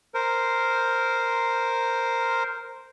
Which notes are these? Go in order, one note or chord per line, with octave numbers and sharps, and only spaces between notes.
A#4 C5